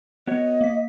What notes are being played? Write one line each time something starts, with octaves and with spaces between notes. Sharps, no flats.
B3 F#4 C#5 D#5
A#3 B6